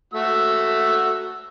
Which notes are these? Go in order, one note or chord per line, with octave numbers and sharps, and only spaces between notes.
A3 F#4 E6